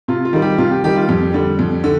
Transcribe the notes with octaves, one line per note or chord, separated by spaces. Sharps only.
C3 F4
F4
D#3 G3
G4
C3 F4
G4
D#3 G3 G4
F4
F2 G4
D3 G3
F2
D3